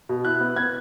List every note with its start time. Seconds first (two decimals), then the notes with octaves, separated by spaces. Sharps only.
0.09 B2
0.25 E4 F#6
0.40 B3
0.56 B3 G#6